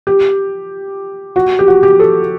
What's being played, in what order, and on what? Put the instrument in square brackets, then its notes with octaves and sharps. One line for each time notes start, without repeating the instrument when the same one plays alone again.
[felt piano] G4
F#4
G4
F#4
G4
A4